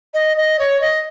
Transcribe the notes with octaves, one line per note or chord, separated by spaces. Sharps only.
D#5
D#5
C#5
D#5